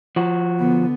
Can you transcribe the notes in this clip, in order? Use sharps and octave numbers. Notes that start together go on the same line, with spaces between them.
F3 F#4
D3 B3